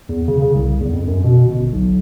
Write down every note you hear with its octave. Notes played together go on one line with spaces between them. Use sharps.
E2
C#3
C#3
C2
E2
F2
F#2
B2
G1
B1